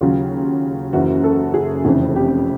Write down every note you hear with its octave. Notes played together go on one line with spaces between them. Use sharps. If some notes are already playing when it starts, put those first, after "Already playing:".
D#2 C#3 F#3 F4
F#1 F#2 C#3 E3 F#4
A4
G#4
F1 F2 C#3 E3
G4